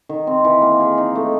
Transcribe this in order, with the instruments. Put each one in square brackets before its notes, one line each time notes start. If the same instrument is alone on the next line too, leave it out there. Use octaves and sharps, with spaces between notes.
[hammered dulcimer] D#3
C4
E3
A#3
G#4
D#4
A3